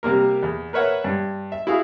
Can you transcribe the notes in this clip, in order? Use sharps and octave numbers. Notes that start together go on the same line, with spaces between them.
C3 G3 A#3 A#4
E2
A#4 B4 C#5 E5 F#5
G2
E5
E4 F#4 G#4 F5